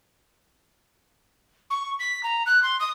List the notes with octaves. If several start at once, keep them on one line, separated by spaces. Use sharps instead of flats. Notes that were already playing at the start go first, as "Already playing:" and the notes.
C#6
B6
A#5
F#6
C6
D#6